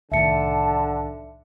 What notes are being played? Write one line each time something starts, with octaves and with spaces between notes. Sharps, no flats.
C2 A2 D3 D#3 E5 A5 C#7